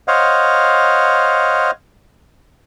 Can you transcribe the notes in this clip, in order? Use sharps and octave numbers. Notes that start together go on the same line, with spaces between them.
C5 C#5 D#5 F5 F#5